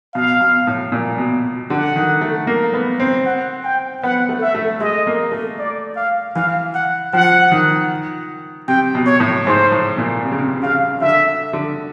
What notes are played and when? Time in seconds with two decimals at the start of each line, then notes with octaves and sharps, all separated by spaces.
0.14 B2 F5
0.41 B2
0.67 A2
0.92 A#2
1.18 B2
1.70 D3 F#5
1.96 D#3
2.21 A3
2.47 A#3
2.74 B3
3.00 C4
3.26 F#5
3.65 G5
4.03 B3 F#5
4.29 A3
4.42 E5
4.55 A3
4.80 G#3 D#5
5.07 A#3
5.32 A3
5.58 D5
5.96 F5
6.36 E3 F5
6.75 F#5
7.13 F3 F#5
7.51 D#3
8.68 C3 G5
8.95 B2
9.07 C#5
9.20 A2
9.47 G#2 C5
9.72 A2
9.98 A#2
10.24 C3
10.31 C#3
10.38 C3
10.63 C#3 F5
11.01 D3 E5
11.53 D3